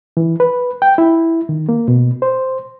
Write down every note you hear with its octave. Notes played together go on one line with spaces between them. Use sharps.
E3
B4
G5
E4
D#3
A#3
B2
C5